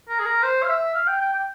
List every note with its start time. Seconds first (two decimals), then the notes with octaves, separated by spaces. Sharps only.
0.09 A#4
0.19 G#4
0.26 A#4
0.43 C5
0.63 F5
0.69 E5
0.95 F5
1.08 G5
1.21 G5
1.33 G5